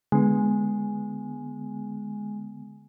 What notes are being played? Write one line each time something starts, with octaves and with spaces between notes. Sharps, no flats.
D3 G#3 B3